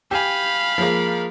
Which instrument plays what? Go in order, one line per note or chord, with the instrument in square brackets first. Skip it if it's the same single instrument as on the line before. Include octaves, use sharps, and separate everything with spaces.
[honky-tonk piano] G4 G#5 [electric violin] F5 B5
[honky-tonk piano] F3 G#3 A#3